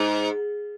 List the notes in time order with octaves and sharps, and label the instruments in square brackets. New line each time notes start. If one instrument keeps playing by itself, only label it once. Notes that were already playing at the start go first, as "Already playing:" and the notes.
Already playing: [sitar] G#2